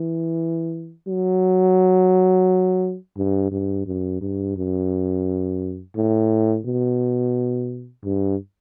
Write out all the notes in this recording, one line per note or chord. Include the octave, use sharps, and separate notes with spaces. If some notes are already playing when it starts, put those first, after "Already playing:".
Already playing: E3
F#3
G2
G2
F#2
G2
F#2
A2
B2
G2